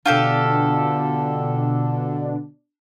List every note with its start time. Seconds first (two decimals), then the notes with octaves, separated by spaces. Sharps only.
0.06 B2 D3 D4 F4 G4 A4